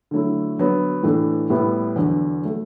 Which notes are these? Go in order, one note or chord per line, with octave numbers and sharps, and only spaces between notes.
D3 F#3 A3 E4
D3 F#3 B3
A2 E3 A3 D4
A2 G3 B3 E4
E2 D3 F#3
F#3 A3